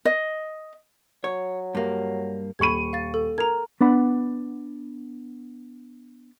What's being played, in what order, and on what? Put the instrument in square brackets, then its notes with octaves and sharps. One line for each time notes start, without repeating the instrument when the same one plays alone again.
[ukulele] D#5
[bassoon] F#3 [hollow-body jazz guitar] C#5
[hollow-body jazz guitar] G2 A#3
[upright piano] D#1 C#6 D#7 [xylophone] B5 G#6
[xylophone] F5 A6
A4
[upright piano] A#4 [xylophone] A#5 G#6
[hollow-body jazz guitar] B3 D4 F#5 B5